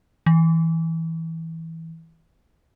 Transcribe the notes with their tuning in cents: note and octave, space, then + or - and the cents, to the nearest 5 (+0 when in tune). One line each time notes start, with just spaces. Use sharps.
E3 -15